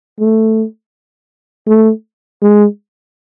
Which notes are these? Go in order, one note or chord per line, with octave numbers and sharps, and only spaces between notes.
A3
A3
G#3